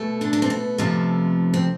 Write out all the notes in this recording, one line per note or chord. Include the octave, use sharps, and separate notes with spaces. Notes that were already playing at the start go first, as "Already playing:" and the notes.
Already playing: B2 A3
D3 D4
D4
C4
B3
F2 C3 F3 A3
C4